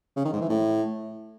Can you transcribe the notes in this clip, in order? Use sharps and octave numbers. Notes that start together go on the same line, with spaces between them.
C#3
D#3
G#2
E3
A2